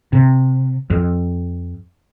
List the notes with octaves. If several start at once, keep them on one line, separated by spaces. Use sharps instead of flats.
C3
F2